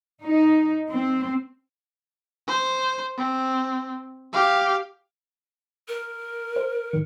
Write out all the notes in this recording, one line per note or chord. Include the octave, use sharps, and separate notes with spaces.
D#4
C4
C5
C4
G4 F5
A#4
C5
A2 D#3 C#7